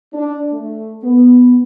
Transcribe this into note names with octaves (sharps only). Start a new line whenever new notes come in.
D4
A3
B3